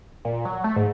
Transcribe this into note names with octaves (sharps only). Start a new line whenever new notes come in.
A#2
F#3
A3
G#2